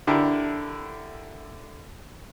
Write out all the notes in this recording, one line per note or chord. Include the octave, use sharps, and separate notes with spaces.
D3 D4 E4 G4 A#4